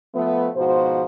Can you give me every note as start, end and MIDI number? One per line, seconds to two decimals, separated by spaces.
0.15 0.50 53
0.15 0.50 57
0.15 0.50 59
0.56 1.04 44
0.56 1.04 47
0.56 1.04 53
0.56 1.04 66
0.56 1.04 72